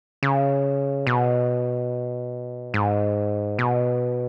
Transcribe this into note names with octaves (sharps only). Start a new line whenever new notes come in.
C#3
B2
G#2
B2